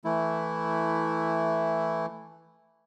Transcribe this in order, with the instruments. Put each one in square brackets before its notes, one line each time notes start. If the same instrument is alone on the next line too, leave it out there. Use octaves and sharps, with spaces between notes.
[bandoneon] E3 A3 E4